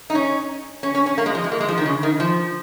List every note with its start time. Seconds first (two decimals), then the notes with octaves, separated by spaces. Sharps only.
0.10 D#4
0.15 C#4
0.83 C#4
0.95 C#4
1.06 C#4
1.18 A#3
1.26 G#3
1.35 F3
1.44 G#3
1.52 A#3
1.60 G#3
1.68 F3
1.78 D#3
1.86 C#3
2.03 D#3
2.20 F3